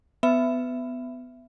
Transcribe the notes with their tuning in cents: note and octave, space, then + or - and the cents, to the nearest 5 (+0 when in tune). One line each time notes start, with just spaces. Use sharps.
B3 +20 E5 +15